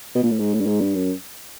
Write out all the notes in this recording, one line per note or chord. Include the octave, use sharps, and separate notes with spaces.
B2
A#2
A2
G#2
A2
G2
G#2
G2
F#2